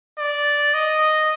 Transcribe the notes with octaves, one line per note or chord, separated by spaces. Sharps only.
D5
D#5